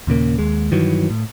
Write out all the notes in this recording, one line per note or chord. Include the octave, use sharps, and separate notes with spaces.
D#2 A#2 C#3 A#3
D#2 G#3
G2 D#3 E3 F#3
A2